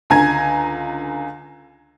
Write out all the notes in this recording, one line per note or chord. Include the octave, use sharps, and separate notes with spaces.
C#2 D3 G#5 A#5 G#6